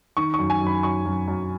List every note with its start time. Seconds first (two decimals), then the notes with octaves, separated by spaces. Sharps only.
0.17 D#3 C#6
0.34 F#2 C#6
0.50 G#5
0.61 F#2
0.67 B5
0.83 F#2 C#6
1.06 F#2
1.28 F#2